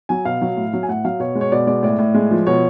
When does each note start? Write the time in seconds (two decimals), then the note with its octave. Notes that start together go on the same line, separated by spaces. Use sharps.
0.09 F#3 G#5
0.25 B2 F5
0.42 F#3
0.57 A2
0.73 F#3
0.83 G#5
0.88 A2 F#5
1.04 F#3 F5
1.20 B2 C#5
1.35 G#3
1.41 C#5
1.52 B2 D5
1.67 G#3 D5
1.83 A2 D5
1.99 A2
2.14 G#3
2.31 F3
2.47 B2 C#5